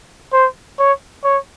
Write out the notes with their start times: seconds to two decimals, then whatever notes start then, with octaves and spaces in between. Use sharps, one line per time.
0.33 C5
0.79 C#5
1.24 C#5